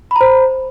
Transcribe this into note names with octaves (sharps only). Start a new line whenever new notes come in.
C5 A#5 B5